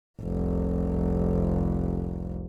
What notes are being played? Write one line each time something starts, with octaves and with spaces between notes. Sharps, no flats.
F1 C2